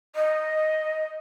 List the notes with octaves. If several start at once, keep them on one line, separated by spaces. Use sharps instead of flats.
D#5